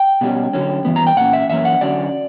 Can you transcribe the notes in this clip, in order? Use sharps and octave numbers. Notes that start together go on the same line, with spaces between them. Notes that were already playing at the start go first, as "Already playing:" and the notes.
Already playing: G5
B2 G3 C#4
D3 F#3 C#4
G2 E3 B3
A#5
G5
A#2 A#3 C#4 F#5
E5
F#2 E3 A#3 C#4 E5
F#5
D3 F#3 C#4 D5